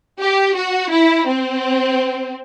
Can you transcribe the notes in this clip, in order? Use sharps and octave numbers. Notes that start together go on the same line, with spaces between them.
G4
F#4
E4
C4